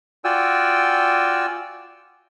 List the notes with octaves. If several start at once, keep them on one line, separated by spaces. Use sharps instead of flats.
F4 F#4 D5 G5 G#5 E6